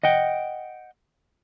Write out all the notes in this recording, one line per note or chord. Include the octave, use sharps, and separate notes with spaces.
D#5 F#5 G5